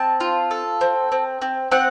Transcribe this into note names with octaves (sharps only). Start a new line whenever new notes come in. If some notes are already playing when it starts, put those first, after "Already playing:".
Already playing: C4 A5
F4
A4
C4
C4
C4
C4 F#5